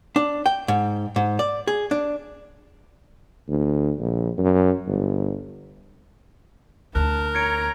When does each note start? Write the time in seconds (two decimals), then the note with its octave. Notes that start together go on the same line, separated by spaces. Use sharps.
0.16 D4
0.46 G5
0.68 G#2
1.16 G#2
1.39 D5
1.67 G#4
1.91 D4
3.48 D2
3.99 A#1
4.38 F#2
4.87 G1
6.95 D2 D4 A#4 A5 F#6
7.35 C#5 A#5 G#6 C#7 D7